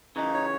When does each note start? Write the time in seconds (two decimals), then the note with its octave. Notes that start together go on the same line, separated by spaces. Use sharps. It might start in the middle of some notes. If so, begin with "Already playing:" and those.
0.16 C#3 E3 D#4
0.34 C#5